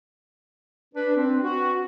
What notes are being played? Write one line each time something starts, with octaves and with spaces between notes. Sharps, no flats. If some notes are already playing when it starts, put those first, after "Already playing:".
D4 B4
C4
F#4